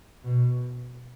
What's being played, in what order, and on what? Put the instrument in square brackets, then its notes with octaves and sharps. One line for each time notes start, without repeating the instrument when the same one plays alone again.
[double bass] B2